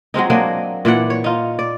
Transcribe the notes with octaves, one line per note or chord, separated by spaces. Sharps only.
F#3 G#3 C4 D#4
F#3 A#3 D4 D#5
A#2 E3 D5 F#5
C#5
D#4 F4
D5